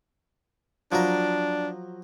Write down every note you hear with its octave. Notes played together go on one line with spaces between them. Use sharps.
F3 F#3 D4 A#4